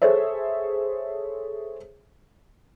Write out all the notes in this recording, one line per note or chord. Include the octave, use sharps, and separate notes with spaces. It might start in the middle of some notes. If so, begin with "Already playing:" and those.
G#4 A4 C5 C#5 E5